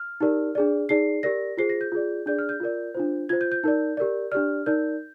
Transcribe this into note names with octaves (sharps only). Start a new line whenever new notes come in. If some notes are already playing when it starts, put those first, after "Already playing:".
Already playing: F6
D#4 G4 A#4 D5
D4 G#4 D5
D#4 G#4 D5 C7
G4 A#4 D5 A#6
F4 G#4 C5 C7
A#6
G6
F4 G#4 D5
D4 G#4 D5 G6
F6
G6
F4 A#4 D5
D4 F4 C5
F4 C5 G#6
G6
G6
D#4 A#4 D5
G4 A#4 D5
D4 G4 D5 F6
D#4 A#4 D5 G6